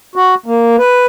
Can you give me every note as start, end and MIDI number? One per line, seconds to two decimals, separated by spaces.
0.16 0.35 66
0.46 0.76 58
0.79 1.06 71